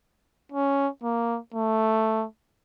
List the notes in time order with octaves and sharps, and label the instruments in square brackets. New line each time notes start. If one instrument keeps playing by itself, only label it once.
[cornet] C#4
A#3
A3